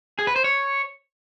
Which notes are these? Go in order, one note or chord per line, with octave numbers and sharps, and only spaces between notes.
G#4
B4
C5
C#5